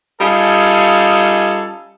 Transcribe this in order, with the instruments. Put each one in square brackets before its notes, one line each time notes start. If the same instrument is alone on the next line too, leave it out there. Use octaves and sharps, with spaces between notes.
[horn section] G3 C#4 D#4 F4 G#4 A4